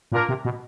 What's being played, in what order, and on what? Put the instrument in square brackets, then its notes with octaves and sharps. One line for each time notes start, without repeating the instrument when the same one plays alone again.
[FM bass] A#2 [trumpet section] A#3 D4 F4 A#4
[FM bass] C3
B2